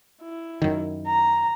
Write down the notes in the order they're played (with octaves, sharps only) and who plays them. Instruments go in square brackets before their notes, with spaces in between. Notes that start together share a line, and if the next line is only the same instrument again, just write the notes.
[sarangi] E4
[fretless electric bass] F#2 D#3
[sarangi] A#5